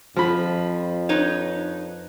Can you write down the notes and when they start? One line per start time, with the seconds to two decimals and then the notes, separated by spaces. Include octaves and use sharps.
0.16 F2 F3 B5
1.09 D#4 B4 C#5